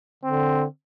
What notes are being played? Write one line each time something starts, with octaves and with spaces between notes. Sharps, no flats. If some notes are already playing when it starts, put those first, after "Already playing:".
D3 C4